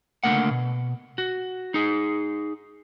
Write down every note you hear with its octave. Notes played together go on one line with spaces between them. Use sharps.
C#2 D3 A3 A#3 F#5
B2
F#4
D#4 G#4